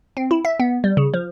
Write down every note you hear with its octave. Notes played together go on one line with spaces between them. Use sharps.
C4
E4
E5
B3
G3
C#3
F3